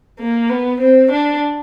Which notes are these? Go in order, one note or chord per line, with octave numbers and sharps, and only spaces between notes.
A#3
B3
C4
D4